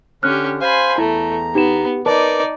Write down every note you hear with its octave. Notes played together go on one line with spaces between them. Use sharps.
D3 C#4 G4 F6 F#6
C5 F5 G#5 B5 C6
E2 A3 E4 A#5
B3 D#4 G4 E7
D#4 A#4 B4 D5 A5 D6